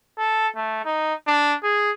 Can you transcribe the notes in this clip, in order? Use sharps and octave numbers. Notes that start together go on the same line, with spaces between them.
A4
A3
D#4
D4
G#4